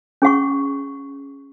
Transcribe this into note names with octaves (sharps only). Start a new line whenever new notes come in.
C#4 G#4 F#5 C#6